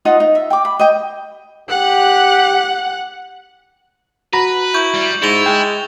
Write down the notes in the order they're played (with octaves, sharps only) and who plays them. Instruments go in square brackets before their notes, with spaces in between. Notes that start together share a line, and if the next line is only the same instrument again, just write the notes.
[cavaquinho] D#4 F4 D#5 F#5
D#4
E5
G5 D6
B5
D#5 G5
[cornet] G4 [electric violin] F#5 F#6
[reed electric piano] F#4 A#5 B5 [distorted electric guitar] B4
[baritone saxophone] E4 [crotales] C#6 G6 F#7
[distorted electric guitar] G3
[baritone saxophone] G#2 [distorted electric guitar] E4 [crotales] A6 F7 G7
[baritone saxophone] G#3 [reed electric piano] G5